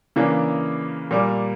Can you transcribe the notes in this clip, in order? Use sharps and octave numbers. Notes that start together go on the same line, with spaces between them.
C#3 E3 A#3 D4
A#2 G3 A#3